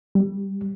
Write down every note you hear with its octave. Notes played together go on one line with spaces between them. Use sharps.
G3